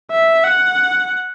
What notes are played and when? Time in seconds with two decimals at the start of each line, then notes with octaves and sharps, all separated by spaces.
0.11 E5
0.44 F#5